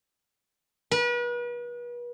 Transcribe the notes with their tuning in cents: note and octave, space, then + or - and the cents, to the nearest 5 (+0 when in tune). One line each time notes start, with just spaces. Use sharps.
B4 -40